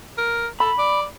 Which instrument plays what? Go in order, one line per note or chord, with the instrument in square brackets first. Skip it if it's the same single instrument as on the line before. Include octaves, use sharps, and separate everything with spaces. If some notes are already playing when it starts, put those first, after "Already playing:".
[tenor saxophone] A#4
[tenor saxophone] A4 [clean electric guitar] B5
[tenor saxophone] D5